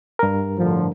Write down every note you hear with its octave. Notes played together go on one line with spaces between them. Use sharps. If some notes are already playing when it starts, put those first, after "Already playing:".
G2 A#4
A2 D3 F3